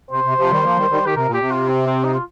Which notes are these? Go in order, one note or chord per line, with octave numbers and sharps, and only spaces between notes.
C3 C5
C3
C3 F3
D#3 G3
F3 A#3
D#3 G3
D#3 G3
D#3 G4
C3 A#4
A#2
G4
C3
F4
C4
C4
D#4
F4